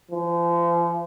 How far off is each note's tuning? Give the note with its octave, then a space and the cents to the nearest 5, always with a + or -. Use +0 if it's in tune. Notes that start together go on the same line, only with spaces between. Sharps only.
F3 -35